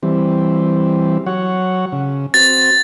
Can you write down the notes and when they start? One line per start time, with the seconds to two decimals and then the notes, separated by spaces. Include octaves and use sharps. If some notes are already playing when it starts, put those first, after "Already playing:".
0.03 E3 G3 C4
1.26 F#3 C#5 F#5
1.92 C#3
2.34 C4 F#4 A6